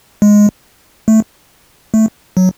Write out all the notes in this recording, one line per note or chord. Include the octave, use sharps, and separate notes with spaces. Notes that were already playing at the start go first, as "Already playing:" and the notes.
G#3
A3
A3
F#3